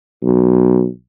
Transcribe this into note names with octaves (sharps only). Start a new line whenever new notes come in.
B1